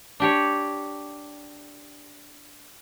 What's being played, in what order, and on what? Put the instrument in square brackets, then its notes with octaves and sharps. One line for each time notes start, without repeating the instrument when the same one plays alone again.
[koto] D4 G4 C#5